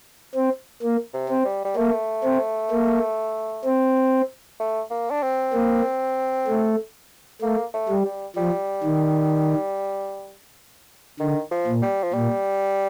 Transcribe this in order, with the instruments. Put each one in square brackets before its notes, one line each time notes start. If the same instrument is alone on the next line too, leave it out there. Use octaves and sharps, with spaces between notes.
[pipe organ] C4
A#3
[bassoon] C3
[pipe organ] C4
[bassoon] G3
G3
[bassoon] A3 [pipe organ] A#3
[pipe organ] C4
A#3
C4
[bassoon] A3
A#3
D4
C4
[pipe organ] A#3
A3
[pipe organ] A3 [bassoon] A#3
[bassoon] A3
[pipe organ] G3
[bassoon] G3
[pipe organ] F3 [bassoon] G3
[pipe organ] D#3
[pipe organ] D3 [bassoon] D#3
[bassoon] F3
[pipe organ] A#2
[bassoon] G3
F3
[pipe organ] A#2 [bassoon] G3